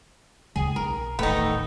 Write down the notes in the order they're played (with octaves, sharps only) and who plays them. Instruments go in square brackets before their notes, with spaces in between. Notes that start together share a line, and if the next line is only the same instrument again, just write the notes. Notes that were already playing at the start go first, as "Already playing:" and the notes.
[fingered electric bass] D2 C#3 G#3 [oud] G#4
[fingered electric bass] B1 [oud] A#4
[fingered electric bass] D#1 A1 [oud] D#3 A3 [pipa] B3 D#4